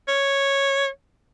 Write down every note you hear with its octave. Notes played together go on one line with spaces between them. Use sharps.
C#5